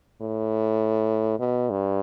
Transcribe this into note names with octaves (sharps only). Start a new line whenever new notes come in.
A2
B2
G2